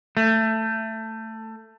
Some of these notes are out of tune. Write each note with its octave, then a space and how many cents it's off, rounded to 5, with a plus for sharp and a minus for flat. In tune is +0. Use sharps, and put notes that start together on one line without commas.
A3 +15